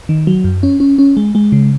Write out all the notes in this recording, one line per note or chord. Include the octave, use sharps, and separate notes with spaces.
D#3
F#3
F#2
C#4
C#4
C#4
G#3
G#3
C#3